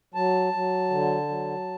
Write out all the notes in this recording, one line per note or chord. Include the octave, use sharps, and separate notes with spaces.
F#3 A5
F#3
D3
F#3